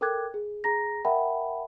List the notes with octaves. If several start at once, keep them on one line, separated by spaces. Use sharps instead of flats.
A4 A#4 G5 D6 F#6 G#6
G#4
G#4 A#5 A#6
A#4 E5 F#5 G5 A5 B5